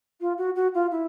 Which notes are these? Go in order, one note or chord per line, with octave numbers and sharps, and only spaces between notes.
F4
F#4
F#4
F4
E4